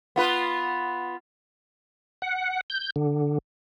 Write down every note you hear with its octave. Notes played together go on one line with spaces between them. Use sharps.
B3 F4 B4
F#5
G6
D3